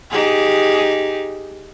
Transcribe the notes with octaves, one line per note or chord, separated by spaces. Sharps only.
D#4 G4 G#4